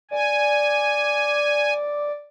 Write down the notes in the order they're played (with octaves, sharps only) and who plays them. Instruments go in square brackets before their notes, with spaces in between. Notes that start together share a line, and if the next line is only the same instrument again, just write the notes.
[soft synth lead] D5 [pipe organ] G#5